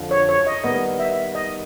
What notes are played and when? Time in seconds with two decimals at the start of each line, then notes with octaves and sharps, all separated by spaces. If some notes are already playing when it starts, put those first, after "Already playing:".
Already playing: F2 D3 F3
0.11 C#5
0.29 C#5
0.47 D#5
0.64 D#3 G3 B3 D#5
0.99 E5
1.35 D#5